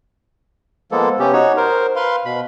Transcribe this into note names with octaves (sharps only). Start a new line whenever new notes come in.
F3 G#3 A#3 B3 A4
C3 B3 C#4 G4
D#4 F#4 C#5
A#4 C5
B4 F5 C6
B2 B5